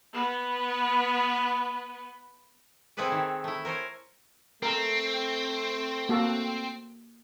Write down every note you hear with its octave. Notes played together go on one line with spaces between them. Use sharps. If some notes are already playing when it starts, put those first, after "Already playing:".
B3 B4
C4 E4 G#4 A4 B4 D5
D#3
A3 E4
A#4 C5 C#5 G#5
A3 C4 A#4 A#5
A#3 F#4 A4